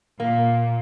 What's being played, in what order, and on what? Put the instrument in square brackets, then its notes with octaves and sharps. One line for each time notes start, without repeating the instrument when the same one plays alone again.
[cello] A#2 [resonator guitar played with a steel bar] A#3